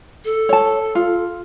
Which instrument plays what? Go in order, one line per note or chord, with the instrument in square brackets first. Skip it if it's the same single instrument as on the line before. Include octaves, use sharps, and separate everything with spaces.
[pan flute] A4
[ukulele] C#5 A5
F4